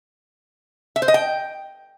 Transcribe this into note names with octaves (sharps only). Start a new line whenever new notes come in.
E5
C5
D#5
G5